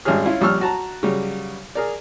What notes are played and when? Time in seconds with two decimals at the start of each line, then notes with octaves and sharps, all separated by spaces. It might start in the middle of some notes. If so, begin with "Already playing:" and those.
0.05 G#1 G3 C#4 D4 G#4 F6
0.25 C#4 E4 F4
0.41 A#1 G3 C#4 C#6 E6 F6
0.61 F#4 A5 A#5
1.03 C#3 F#3 G3
1.75 G#4 A#4 D5